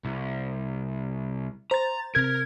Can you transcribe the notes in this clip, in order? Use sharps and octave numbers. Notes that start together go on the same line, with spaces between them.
C2
C5 A#5 A6
C3 A#4 G#6